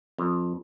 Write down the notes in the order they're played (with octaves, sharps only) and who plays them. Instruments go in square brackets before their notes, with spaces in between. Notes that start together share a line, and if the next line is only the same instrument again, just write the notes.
[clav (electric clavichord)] F2